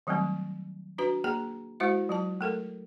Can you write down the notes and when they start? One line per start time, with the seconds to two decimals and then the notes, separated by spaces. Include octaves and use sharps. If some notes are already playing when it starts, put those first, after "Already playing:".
0.07 D#3 F#3 G3 A3 C4
0.98 D4 F#4 B4 A#5
1.24 A#3 G#4 A#5
1.80 G#3 E4 F#4 C5 E5
2.09 F#3 F4 A5
2.41 A3 A4 A#4